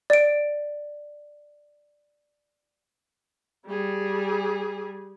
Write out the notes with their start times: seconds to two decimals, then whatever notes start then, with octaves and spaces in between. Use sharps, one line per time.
0.10 D5 D7
3.67 G3 G#4